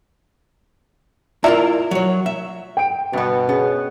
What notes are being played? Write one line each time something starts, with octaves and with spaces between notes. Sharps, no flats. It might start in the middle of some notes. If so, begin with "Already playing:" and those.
E4 F4 A#4 D5 E5 A#5
F#3 C#5
E5
G5 D7
G2 B2 B3
B3 C#4 G#4